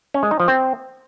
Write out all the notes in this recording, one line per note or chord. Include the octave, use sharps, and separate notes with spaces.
C#4
G#3
D#4
F3
C4